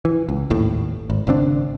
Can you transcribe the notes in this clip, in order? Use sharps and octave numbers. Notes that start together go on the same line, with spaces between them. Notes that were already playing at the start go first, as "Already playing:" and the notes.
E3
C#2
G#1 D#2 A2
G#1
G#1 C#3 C4 D4